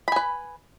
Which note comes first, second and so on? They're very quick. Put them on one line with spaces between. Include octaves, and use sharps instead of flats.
B5 G#5 B4